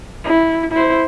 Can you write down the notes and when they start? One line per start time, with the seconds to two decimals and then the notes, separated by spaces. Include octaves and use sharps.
0.24 E4
0.72 E4 C5